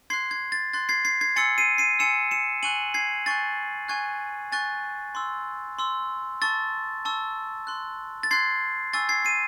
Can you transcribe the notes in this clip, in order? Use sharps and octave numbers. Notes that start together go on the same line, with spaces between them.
C6 F#6 G#6 C7
G#6
A6
C6 F#6 A6
G#6 C7
G#6 C7
G#6 C7
G#5 C6 E6 A6 C#7
C7 D#7
C7 D#7
G#5 C6 E6 C#7 E7
C#7 E7
G#5 C#6 F#6 D#7 F#7
G#6 C7
G#5 C#6 F#6 A6
G#5 C#6 F#6 G#6
G#5 C#6 F#6 A6
C6 E6
C6 E6
A5 C#6 E6 A6
A5 C#6 E6
C6 F#6
A6
C6 F#6 G#6 C7
G#5 C#6 E6 A6
G#6 C7
C7 D#7